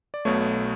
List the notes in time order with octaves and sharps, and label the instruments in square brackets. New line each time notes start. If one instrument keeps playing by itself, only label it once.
[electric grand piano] D5
B1 B2 A3 C#5